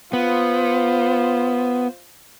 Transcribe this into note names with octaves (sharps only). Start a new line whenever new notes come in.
B3 F4 C5